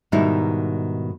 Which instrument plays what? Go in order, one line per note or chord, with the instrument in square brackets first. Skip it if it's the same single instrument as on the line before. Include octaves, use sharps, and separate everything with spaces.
[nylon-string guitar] G#2 B2 D#3 G3 D#4 E4